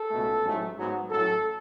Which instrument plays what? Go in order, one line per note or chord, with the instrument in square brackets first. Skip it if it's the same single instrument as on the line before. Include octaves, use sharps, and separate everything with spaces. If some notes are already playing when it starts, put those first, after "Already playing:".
Already playing: [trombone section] A4
C#2 B2 A3
A1 G#2 F#3 A3
G#2 F#3 B3
A1 A2 F#3 A4